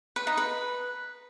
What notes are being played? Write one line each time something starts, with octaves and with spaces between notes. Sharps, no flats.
B4
D#4
B4